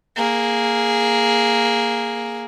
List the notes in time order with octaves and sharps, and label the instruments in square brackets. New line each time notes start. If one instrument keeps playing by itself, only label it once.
[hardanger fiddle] A#3 G#4